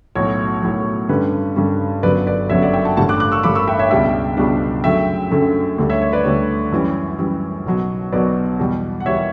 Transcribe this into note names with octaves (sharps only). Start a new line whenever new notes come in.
B1 A2 F#3 C#5
B1 A2 F#3
G2 D3 G3 C#4 B4
G2 D3 G3 C#4
G1 F#2 D3 F#3 B4 D5
B4 D5
G1 F#2 D3 F#3 C#5 E5
D5 F#5
E5 G5
F#5 A5
A1 G2 D3 F#5 A5
D6 F#6
D6 F#6
C#6 E6
A1 G2 D3 B5 D6
C#6 E6
E5 G5
C#5 E5
C#2 B2 G3 D4 E5 G5
C#2 B2 G3 D4
F#2 D3 F#3 A3 C#4 E5 G5
F#2 D3 F#3 A3 C#4
D2 D3 G3
C#5 E5
C#5
B4 D5
D2 D3 G3 C#5
F#2 E3 G3
F#2 E3 G3
B1 B2 F#3
B1 B2 F#3 B4 D5
E2 B2 G3
F#5
E2 B2 G3 C#5 E5